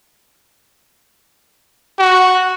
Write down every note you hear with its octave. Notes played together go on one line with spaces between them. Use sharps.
F#4